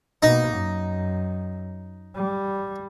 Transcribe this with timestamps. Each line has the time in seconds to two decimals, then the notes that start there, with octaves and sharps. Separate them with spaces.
0.23 B2 A#3 D#4
0.55 F#2
2.16 G3